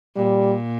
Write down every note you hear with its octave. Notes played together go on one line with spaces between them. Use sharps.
A#2 G3